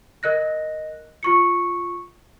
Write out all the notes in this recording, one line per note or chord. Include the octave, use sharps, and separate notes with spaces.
A#4 D#5 F#6 A#6
F4 C#6 C#7